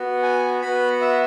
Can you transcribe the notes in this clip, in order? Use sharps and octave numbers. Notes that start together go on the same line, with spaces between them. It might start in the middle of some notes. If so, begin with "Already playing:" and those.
Already playing: B3 F#4
G#5
B3 F#4 B5
E5